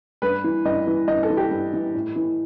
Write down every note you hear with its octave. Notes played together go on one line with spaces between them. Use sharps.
G2 B4
E3
G2 D#5
E3
G2 D#5
A4
E3
G4
G2
E3
A2
E3